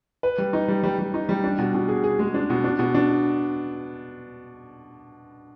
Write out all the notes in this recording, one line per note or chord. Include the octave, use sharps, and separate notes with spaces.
B4
G3
D#4
G3
G3
G3
D#4
G3
D4
B2
B2
G#4
G#4
G#3
D4
B2
D4
B2
D4